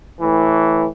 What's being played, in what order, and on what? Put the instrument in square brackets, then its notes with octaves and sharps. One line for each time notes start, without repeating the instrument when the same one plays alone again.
[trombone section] A2 E3